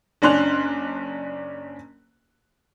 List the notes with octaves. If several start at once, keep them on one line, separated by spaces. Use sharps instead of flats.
F#1 C#4 D4 C6 F#6 F7